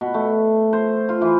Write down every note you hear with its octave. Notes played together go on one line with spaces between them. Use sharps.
B2
A3
C5
F4
E3